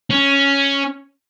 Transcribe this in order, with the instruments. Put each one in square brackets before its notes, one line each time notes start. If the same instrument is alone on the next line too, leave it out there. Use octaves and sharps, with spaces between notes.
[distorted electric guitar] C#4